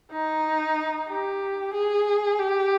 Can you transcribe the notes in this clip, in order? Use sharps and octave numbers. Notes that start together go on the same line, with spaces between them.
D#4
G4
G#4
G4